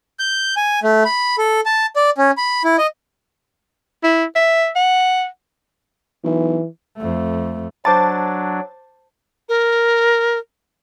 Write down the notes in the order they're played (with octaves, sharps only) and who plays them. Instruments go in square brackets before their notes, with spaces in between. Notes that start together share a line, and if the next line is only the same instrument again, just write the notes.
[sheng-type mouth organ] G6
G#5
A3
B5
A4
A5
D5
C#4
B5
E4
D#5
[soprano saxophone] E4
E5
F#5
[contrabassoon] B1 [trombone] E3
[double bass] F2 A3
[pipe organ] F#3 D4 [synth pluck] C5 D6 A6 [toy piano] A5
[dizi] A#4